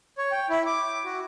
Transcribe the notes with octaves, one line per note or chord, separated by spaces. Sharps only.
C#5
G5
E4
D6
F#4